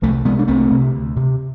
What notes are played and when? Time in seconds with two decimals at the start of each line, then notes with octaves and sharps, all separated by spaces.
0.02 C2 F3 A3
0.25 C3 G#3 B3
0.39 D4
0.48 C2 A3 C4
0.71 C3
0.94 D2
1.16 C3